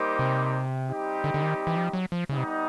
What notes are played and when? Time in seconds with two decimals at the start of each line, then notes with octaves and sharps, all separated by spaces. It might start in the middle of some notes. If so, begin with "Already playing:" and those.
Already playing: G3 A#3 D#4 G4 C5
0.19 C3
0.89 G3 C4 D#4 G4
1.24 D3
1.34 D3
1.42 D#3
1.67 E3
1.77 F3
1.93 F#3
2.12 F3
2.29 C#3 G3 B3 D#4
2.38 C3